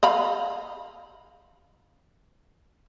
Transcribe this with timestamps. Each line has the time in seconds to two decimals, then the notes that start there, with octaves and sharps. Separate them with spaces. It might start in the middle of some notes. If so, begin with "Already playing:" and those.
0.03 D#5 F5 B5